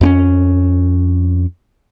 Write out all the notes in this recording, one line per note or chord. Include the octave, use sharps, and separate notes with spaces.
F2 C4 C#4